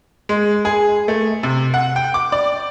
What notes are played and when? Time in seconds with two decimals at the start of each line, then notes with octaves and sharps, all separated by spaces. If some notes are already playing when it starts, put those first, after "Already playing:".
0.29 G#3
0.65 G#4
1.08 A3
1.43 C3
1.74 F#5
1.96 G5
2.14 D6
2.32 D5